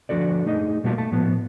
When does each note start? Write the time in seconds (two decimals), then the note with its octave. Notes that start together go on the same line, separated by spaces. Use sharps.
0.09 F3 D4 F#4 A4 D5
0.46 A3 D#4 G#4 D#5
0.84 B2 G3 A#3 F4 F#4 A5
0.98 A3 A5
1.12 A2 F3 B3